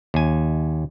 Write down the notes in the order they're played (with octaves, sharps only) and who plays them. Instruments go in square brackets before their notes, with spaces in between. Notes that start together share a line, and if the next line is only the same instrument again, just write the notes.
[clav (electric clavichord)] D#2 G#5